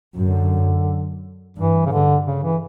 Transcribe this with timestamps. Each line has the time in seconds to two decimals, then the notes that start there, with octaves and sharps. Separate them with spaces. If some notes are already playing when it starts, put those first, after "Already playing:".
0.18 F#2 D3
1.57 G2 E3
1.86 C#3
1.91 G2 D3
2.26 C#3
2.44 E3